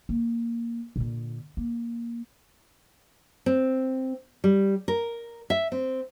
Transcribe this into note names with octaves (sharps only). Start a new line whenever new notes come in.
A#3
A#2 D3
A#3
C4
G3
A#4
E5
C4